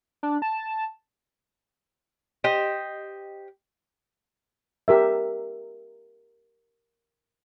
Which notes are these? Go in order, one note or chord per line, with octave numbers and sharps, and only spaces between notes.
D4
A5
G4 C5 D#5
G4 A#4 E5